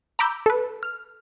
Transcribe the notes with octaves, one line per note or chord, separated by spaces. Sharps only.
A#5 B5 D6 E6 G6
A4 B4
F6